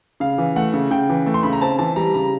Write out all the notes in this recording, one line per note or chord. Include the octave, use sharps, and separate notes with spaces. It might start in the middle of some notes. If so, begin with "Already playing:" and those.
C#3 F5
E3
A3 F#5
C#3
C#3 G5
E3
A3
C6
C#3 B5
A#5
C4 A5
E3 A5
G3 A#5
C#3 A#5